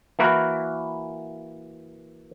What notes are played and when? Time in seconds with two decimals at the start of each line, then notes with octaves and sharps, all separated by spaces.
0.19 E3 A#3 E4 F#4 A#4 B4